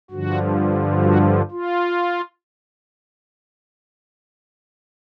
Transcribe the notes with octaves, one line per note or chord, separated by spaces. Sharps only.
G2 D3 F3 F#4
F#4
F4